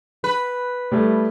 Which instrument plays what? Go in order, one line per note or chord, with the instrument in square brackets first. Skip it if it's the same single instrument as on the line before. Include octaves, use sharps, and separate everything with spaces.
[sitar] B4
[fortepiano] A2 G3 A3